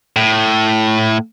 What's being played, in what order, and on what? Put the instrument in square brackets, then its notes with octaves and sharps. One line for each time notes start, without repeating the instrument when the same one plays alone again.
[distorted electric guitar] A2